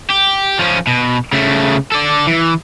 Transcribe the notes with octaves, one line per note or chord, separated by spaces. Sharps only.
G4
F3 C#4
B2
C#3 A3
A4 D5
E3